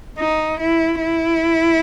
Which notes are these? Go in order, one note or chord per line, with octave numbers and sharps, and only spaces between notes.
D#4
E4
E4